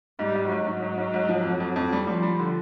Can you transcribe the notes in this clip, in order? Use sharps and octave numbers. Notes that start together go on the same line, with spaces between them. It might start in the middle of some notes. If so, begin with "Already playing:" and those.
G#2 G3
G#2
G#2 F#3
G#2
G#2
G#2
G#2
F3
F2
F2
F2
G3
F3 G3
G3
D3